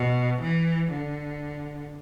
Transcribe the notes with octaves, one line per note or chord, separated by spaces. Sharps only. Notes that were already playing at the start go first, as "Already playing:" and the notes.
Already playing: B2
E3
D3